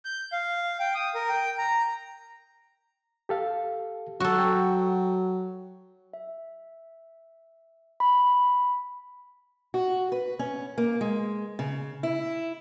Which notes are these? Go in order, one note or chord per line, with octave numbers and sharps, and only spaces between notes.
G6
F5
G5
D#6
A#4
G5
A#5
G4 A4 F5
F#3 F#4 A4
G5
E5
B5
F#4
B4
C#4
A#3
G#3
C#3
E4